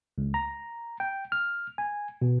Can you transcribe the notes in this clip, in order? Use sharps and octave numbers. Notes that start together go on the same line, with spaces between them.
C#2
A#5
G5
F6
G#5
B2